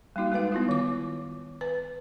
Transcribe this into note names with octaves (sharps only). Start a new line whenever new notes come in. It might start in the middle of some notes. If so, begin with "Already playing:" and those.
G3 A#3 D#4 F#4
G#3 D#4 B4 F5
B3 E4 F4
D#3 D6
B4